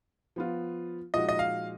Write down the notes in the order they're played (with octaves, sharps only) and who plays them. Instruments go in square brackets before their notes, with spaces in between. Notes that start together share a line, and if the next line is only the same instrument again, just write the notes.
[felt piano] F3 B3 F4
[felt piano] A#2 F3 G#3 D#4 F#4 [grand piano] D#5
[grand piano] D#5
F5